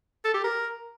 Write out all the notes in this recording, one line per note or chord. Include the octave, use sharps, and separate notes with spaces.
A4
G4
A#4